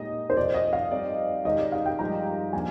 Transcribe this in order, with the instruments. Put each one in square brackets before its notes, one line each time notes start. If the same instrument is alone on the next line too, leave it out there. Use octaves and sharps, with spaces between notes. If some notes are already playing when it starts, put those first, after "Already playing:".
Already playing: [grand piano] A#2 G#3 D#4 G4 [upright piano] D#5
[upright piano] C5
[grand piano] F2 C3 F3 [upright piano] D5
[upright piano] D#5
F5
[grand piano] G3 C4 D#4 G4 D5
[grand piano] D#3 G#3 D#4 G4 [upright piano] D#5
[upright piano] D5
F5
G5
[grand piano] G2 F3 G#3 D#4 G4 [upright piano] A#5
[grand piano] F3 A#3 D4 [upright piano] G#5